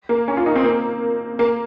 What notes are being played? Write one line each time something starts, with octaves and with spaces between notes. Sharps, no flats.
A#3
C#4
F4
D#4
C4
A#3
A#3